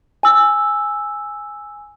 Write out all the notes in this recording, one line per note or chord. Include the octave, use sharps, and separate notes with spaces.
G#5 E6